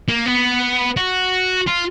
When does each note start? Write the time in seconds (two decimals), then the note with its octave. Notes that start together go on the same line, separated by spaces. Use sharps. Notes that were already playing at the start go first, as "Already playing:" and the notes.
0.08 A#3
0.26 B3
0.97 F#4
1.67 F4